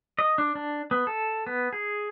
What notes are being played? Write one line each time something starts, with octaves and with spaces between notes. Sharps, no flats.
D#5
D4
D4
B3
A4
B3
G#4